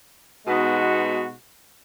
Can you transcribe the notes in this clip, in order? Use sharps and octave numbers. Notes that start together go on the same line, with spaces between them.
B2 G#3 B3 D#4 F#4